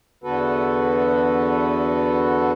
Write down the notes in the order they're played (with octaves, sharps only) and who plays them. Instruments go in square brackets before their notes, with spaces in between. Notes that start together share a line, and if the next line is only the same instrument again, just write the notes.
[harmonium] E2 D3 B3 F#4 A4 B4